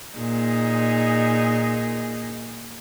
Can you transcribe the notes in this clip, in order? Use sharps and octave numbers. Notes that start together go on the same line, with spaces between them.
A#2 D#4 G#4